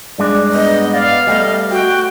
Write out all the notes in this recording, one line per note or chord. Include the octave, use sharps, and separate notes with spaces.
G2 G#3 D4 D5
B3 D#5
D5 F5
G3 A3 D#5
F#4 G5